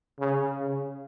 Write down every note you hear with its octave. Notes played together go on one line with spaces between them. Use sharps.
C#3
C#3